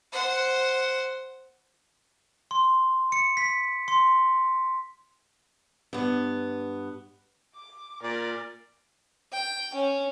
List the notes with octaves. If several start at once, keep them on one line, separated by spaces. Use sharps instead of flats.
C5 F#5
C6
C#7
B6
C6
G2 B3
D6
A#2 A#4 D5
G5
C#4